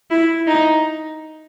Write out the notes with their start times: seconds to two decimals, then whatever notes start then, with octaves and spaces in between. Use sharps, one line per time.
0.11 E4
0.47 D#4